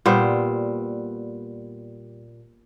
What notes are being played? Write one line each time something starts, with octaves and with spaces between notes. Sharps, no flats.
A#2 G3 B3 C5